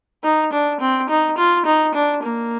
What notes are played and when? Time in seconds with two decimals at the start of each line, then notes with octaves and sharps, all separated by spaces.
0.24 D#4
0.52 D4
0.80 C4
1.09 D#4
1.37 F4
1.66 D#4
1.94 D4
2.23 A#3